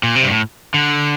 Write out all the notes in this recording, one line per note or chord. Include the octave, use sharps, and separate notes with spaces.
A#2
C3
G2
A2
D3